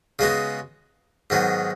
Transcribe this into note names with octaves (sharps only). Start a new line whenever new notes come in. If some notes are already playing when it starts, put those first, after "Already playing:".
C#3 G#3 B3 F#4
G#2 D#3 F#3 B3